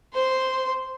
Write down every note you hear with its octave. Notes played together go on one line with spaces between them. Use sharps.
C5 C6